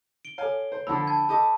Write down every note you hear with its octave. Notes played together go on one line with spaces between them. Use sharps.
D7 G7
A4 C#5 F5 G#5
C5
D3 F3 D4 B5 E6
A5 G#6
G4 A4 D#5 A5